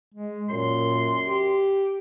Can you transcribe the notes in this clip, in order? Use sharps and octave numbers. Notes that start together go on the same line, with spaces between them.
G#3
F#2 A#2 C6
G4